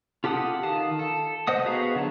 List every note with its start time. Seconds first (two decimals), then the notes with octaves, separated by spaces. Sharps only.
0.24 F4 G4 A4 F#5 D#6
0.63 D#3 F5 A5 D#6
0.99 A4
1.47 C5 D#5 F#5 D#6
1.66 B3 F#4 G#4 F5 A#5
1.96 D3 F#3 A5